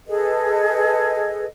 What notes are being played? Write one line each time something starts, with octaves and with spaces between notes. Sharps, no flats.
G#4 A4 B4 D#5